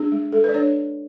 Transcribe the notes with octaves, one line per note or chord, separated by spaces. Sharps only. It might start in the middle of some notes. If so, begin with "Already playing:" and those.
Already playing: D4 G#4
G#3
G#3 A4
B4 D5
D4 C#5